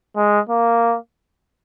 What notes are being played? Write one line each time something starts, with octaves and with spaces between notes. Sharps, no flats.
G#3
A#3